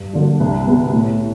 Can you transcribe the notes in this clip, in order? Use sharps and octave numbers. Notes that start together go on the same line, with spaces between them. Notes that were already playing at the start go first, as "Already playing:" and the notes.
Already playing: G2
D3 F#3 A#3 D4
C2
B2 G#3 B3
A2